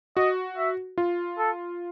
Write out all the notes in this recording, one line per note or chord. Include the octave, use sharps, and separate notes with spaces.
F#4 D#5
E5
F4
A4